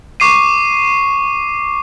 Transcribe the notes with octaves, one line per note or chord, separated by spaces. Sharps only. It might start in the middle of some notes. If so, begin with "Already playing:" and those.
C#6 D6 C7 D#7